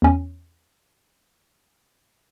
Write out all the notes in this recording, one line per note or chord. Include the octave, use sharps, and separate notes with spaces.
E2 C#4